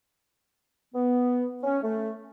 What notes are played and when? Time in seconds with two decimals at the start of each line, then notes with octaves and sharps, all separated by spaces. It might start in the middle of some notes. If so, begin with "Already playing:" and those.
0.94 B3
1.63 C#4
1.82 A3